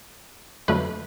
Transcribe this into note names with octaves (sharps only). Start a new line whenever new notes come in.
F2 D3 F#3 A3 B4